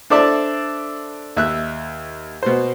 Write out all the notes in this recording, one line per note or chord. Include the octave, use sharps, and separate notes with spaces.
D4 A4 C5 D5 E5 A5
D#2 E5 F#6
B2 C5